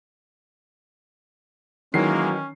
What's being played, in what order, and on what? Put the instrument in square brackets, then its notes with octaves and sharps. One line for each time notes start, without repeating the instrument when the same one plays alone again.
[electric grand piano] D#3 [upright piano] E3 F#3 C7 [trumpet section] G#3 A#3 [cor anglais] C#4